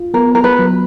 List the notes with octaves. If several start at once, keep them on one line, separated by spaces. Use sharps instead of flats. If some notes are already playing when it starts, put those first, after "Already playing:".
Already playing: F4
B3 A#4
A#4
B4
F#3